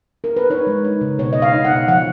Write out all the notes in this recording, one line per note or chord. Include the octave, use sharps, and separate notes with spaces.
A#4
B4
D#4 C#5
G#3
D#4
C#3
B2 C#5
B2 D#5
F5
D#4
F#5
B2
F3 F#5